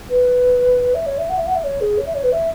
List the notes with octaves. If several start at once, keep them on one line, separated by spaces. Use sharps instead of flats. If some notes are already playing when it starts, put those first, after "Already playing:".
B4
E5
C#5
E5
F#5
E5
F#5
E5
C#5
G#4
C#5
E5
C#5
B4
E5